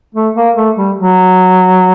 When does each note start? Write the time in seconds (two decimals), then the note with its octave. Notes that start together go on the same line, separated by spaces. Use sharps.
0.15 A3
0.35 A#3
0.56 A3
0.76 G3
0.97 F#3